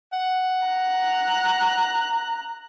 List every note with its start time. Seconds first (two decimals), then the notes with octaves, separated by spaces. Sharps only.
0.13 F#5
0.67 A#5 F#6